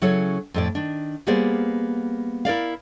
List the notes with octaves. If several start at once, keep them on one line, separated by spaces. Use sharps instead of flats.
C#3 F#3 C#4 E4 A4 C#5
F2 A2 D5
D#3 D4
G3 A#3 B3 G#4 C5 D5
E4 A#4 D5 F5